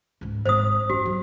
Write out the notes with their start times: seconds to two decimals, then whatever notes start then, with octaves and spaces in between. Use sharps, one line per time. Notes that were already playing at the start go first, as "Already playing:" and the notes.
0.21 C#2 G#2
0.46 G#1 G#2 C5 D#6
0.90 F#1 F#4
1.06 F#3